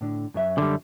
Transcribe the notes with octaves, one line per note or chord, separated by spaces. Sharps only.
A2 D3
F#2 F#3 E5
D3 G3